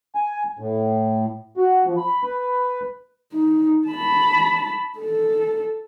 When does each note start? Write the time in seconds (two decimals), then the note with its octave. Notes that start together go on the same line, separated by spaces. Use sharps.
0.15 G#5
0.59 A2
1.57 F#4
1.86 F3
1.97 B5
2.23 B4
3.33 D#4
3.87 A5 B5
4.99 A4